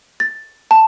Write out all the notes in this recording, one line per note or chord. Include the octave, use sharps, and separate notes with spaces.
A6
A5